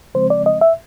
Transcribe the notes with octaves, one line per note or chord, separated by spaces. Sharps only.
C#3 F3 G#3 C4 C5
D5
D#5
E5